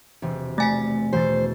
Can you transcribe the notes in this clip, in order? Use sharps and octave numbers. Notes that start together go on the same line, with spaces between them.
E1 C3
A3 G#5 A6 B6
E1 B2 C5 A6